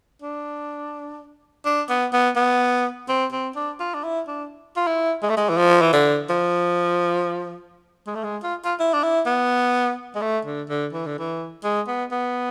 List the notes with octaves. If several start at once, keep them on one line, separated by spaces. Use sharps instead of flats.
D4
D4
B3
B3
B3
C4
C4
D4
F4
D4
E4
D4
F4
E4
G#3
A3
G#3
E3
F3
E3
D3
F3
G#3
A3
G#3
F4
F4
E4
D4
E4
B3
G#3
A3
D3
D3
E3
D3
E3
G#3
B3
B3